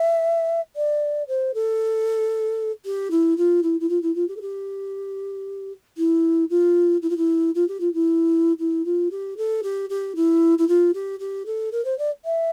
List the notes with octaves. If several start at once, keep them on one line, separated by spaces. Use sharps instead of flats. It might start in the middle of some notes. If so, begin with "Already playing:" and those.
Already playing: E5
D5
C5
A4
G4
E4
F4
E4
E4
F4
E4
F4
G4
A4
G4
E4
F4
E4
F4
E4
F4
G4
F4
E4
E4
F4
G4
A4
G4
G4
E4
E4
F4
G4
G4
A4
A#4
C5
D5
E5